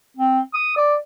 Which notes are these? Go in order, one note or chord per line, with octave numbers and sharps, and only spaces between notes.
C4
D#6
D5